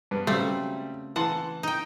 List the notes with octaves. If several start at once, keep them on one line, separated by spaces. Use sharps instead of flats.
G2 B3
C#3 F#3 G3 A3 C4
E3 F#5 A5 C6
D#4 G5